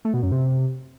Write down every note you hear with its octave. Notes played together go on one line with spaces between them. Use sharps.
A3
B2
F#2
C3